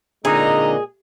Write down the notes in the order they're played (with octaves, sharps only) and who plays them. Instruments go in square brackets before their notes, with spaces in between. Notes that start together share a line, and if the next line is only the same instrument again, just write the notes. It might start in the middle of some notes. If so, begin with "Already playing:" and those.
[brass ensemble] A#2 G#3 D#5 [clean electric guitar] D3 C4 D#4 [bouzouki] G#4 [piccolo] A#5